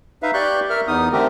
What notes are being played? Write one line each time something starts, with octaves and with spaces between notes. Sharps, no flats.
D#4 B4 E5 F5
G4 D5 C#6 F#6 G6
A#4 E5 F6
E2 B3 D#4 D#6
D3 A3 C4 G4 A#4